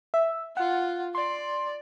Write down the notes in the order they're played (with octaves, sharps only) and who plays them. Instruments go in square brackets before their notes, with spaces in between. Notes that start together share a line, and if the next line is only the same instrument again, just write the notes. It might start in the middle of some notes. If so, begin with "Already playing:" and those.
[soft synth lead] E5
[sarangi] F4 [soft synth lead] F#5
[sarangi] D5 [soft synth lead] C6